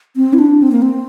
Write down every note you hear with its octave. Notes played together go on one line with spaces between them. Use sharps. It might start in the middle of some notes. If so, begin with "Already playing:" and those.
C4
E4
D4
C4
A#3
C4